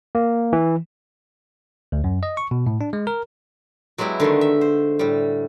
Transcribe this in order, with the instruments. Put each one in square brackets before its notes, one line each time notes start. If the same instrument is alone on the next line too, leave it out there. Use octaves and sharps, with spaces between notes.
[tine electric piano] A#3
E3
D2
F#2
D#5
C#6
B2
A2
D4
G#3
A#4
[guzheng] F#3 G#3 B3 E4 G4
D3 D#3 G#3 A3
E5
C5
A2 G3